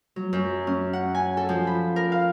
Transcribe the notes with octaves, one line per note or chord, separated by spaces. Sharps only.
F#3
F#2
C#4
F#5
G#5
A4
F3
B5
A#4
F5